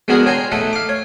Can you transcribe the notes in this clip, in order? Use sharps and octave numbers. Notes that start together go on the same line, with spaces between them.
G#3 B3 D4 F#4 G#4 A#4
C#5 G5 G#5 A#5 C6
A3 D#4 A4 F#5
F5 D6
C#5